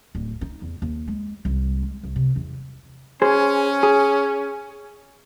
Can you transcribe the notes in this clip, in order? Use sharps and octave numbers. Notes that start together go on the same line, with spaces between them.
D1
D#4
E2
D#2
G#3
C2
G#3
C2
C3
E2
C#4 G#4 C5
G#4